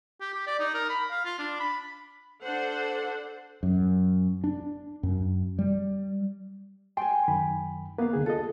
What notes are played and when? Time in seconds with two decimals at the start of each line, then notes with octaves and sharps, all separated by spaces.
0.21 G4
0.34 G4
0.47 D5
0.60 D#4
0.75 A#4
0.89 B5
1.11 F5
1.25 F4
1.39 D4
1.60 B5
2.41 D4 A4 C5 F#5
3.63 F#2
4.44 D4
5.03 F#2
5.59 G3
6.97 G5 G#5 C6
7.28 F#2 D#3 B5
7.98 A#3 B3 B4 F5
8.13 C#2 D3 G#4
8.26 F4 A4 D#5